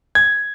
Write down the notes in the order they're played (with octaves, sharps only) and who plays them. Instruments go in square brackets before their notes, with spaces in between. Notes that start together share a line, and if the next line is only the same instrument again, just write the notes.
[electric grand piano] G#6